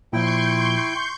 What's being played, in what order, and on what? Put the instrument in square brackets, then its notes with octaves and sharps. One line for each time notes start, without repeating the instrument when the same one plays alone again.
[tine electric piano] A#2 F3 [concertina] E4 G5 [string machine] C6 C#6 G6